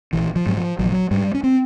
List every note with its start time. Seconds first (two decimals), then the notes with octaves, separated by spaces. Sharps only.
0.13 A#1 E3
0.36 F3
0.46 G#2 F#3
0.57 F3
0.79 A#1 F#3
0.86 F3
0.92 F#3
1.11 G#2 G3
1.34 C#4
1.44 C4